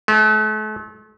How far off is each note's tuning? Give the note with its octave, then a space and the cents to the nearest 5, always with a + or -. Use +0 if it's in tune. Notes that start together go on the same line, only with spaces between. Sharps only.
A3 -40